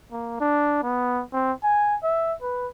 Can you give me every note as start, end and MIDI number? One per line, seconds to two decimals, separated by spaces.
0.12 0.39 58
0.40 0.83 62
0.83 1.24 59
1.33 1.52 60
1.63 1.96 80
2.03 2.34 76
2.42 2.68 71